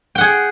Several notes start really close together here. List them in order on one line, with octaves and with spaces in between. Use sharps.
G5 F#5 G#4